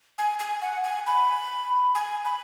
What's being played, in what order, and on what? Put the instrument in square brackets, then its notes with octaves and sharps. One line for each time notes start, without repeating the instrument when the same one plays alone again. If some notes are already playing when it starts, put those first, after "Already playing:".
[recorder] G#5
G#5
F#5
G#5
B5
G#5
B5